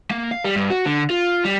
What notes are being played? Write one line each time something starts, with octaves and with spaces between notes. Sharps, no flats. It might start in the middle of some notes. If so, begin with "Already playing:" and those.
A#3
F5
G3
G2
F#4
D3
F4
G3